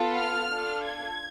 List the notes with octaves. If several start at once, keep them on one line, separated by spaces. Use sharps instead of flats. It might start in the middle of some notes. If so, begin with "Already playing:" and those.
Already playing: B3 F4 A4
F6
D4 F4 A4
G#6